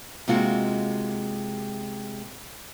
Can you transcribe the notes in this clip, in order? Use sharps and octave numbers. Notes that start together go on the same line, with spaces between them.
C3 G#3 A#3 F4 F#4